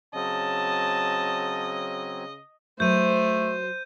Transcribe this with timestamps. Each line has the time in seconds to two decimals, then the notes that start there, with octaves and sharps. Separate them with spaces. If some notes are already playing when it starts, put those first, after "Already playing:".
0.15 C#3 F#3 C4 D#5 A5
2.80 F#3 A3 B4 C5 G6 D#7